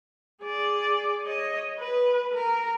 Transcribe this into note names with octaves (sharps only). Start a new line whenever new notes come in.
G#4 D5
C#5 D#5
B4
A#4